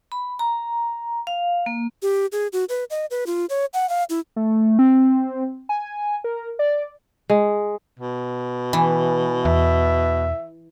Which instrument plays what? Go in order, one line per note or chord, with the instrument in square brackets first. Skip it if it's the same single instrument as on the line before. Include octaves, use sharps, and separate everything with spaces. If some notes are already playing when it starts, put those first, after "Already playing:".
[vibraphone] B5
A#5
F5
A#3
[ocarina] G4
G#4
F#4
B4
D#5
B4
F4
C#5
F#5
F5
E4
[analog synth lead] A3
C4
G#5
A#4
D5
[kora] G#3
[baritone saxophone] B2
[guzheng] E3
[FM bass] E2 [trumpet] E5